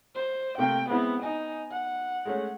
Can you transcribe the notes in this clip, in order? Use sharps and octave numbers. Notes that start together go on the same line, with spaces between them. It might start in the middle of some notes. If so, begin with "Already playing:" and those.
C5
C3 A3 A#3 G5
G#3 B3 C4 E4
D#4 G#5
F#5
G#3 A3 C#4